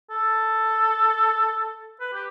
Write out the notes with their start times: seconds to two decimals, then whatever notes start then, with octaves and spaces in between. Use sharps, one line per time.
0.10 A4
2.00 B4
2.13 G4